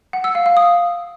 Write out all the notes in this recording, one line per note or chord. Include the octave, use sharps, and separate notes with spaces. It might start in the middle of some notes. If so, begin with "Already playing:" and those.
F#5
E6
F5
F5
D#6